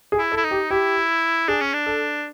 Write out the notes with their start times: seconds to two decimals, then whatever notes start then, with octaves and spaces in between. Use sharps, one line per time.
0.12 G#4
0.18 E4
0.32 A4
0.37 E4
0.44 D#4
0.51 G4
0.70 E4 G4
1.48 D4 G#4
1.61 C#4
1.73 D4
1.86 A4